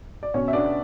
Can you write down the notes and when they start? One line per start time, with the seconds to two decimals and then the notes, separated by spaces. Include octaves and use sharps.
0.23 D5
0.34 B2 C#4 C#5
0.48 E5
0.53 B3 D4 D5